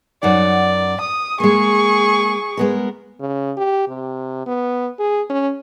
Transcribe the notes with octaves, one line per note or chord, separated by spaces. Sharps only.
F#2 D#4 D5 F#5
D#6
G#3 A#3 G#4 C#6
G#3 B3 A#4
C#3
G4
C3
B3
G#4
C#4